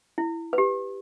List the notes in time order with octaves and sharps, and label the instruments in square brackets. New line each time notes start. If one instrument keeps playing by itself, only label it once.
[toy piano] E4
B4
G4